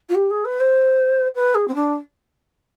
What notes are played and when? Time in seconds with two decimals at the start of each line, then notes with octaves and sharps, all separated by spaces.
0.09 F4
0.15 G4
0.30 G#4
0.45 B4
0.60 C5
1.35 B4
1.55 G#4
1.68 C4
1.75 D4